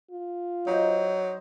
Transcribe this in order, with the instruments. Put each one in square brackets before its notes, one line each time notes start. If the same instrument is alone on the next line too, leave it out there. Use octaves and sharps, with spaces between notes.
[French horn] F4
[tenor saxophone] F#3 [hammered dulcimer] D#4 C5